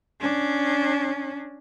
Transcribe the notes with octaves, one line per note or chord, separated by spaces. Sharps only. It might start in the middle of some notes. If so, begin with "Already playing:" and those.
C#4 D4